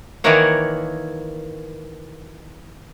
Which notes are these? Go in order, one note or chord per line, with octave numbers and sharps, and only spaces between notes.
D#3 E3 A#3 A#4 C#5 F#5